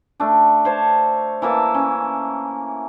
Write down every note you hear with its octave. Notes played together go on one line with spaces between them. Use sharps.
A3 D4
C5 C#5 A5
E3 A#3 E5 A5
C#4